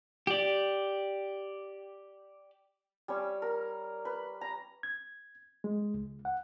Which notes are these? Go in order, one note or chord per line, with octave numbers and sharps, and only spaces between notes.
G4 D5
G3 C#4 C#5
A#4
B4
A#5
G#6
G#3
C#2
F#5